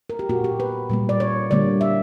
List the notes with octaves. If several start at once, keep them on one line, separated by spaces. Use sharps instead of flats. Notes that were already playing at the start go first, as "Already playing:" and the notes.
A#4
G4
A#2 A#3 F#4
G4
B4
A#2 G3 A#3
D5
C#5
D3 G3 A#3 D5
E5